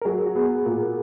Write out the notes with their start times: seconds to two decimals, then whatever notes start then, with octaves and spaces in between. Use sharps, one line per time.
0.02 A#4
0.05 F#3 G#4
0.26 F#4
0.35 B3 G#4
0.65 A#2 A#4